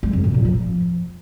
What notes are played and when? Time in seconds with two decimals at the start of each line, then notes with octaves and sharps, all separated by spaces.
0.03 G#3
0.13 F2
0.24 A2
0.34 A#2
0.45 F3